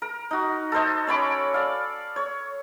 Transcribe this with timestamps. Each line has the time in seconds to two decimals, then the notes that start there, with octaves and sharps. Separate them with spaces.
0.02 A#4
0.31 D#4 F#4
0.72 A4 A#4 C5 D#5
1.07 C#4 C#5 B5 D6
1.54 D5 F5
2.16 C#5